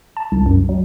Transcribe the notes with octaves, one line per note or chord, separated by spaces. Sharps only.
A5
C2
F#2
F#3